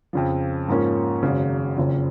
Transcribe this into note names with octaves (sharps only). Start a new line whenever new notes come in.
F2 C#3 F3
G#2 F3 A#3 C#4
G#1 F#2 C#3
F#1 F2 C#3